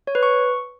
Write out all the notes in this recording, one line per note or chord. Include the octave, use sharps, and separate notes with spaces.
C#5
B4
C#6